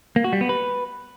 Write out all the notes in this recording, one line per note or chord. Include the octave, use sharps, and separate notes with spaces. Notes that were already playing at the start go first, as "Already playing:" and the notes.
A#3
F#4
G3
B3
B4